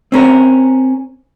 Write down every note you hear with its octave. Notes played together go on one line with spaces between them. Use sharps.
C4 C#4 A#4